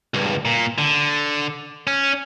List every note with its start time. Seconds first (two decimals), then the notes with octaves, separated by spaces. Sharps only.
0.14 C#2 G2
0.45 A#2
0.78 D3
1.87 C#4